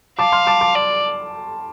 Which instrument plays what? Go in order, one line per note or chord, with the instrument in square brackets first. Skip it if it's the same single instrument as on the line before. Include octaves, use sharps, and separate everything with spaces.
[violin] F5 [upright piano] A5 D6
[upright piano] C6 F6
A5 D6
A5 D6
[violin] D5